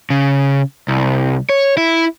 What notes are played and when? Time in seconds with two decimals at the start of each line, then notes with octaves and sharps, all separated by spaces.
0.10 C#3
0.88 C2
1.49 C#5
1.77 E4